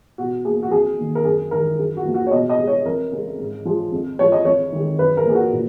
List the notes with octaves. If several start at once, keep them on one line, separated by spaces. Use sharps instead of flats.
B2 F#4
A#3 G#4
F#4
F2 G#4
D#3 A#3
A#4
F#2 G#4
D#3 G#3 A#4
F#2 G#4
F#4
C#3 F3 A#3
F#4
C#5
B2 D#5
D#5
G#3
C#5
F2 A#4
C#3 G#3
G#2
F3 G#3
F2
F3 G#3 C#5
D#5
F2 C#5
D#3 G#3
F#2 B4
A#4
F3 A#3 G#4
F#4
A#2